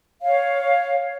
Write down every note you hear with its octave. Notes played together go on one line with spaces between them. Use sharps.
C#5 F5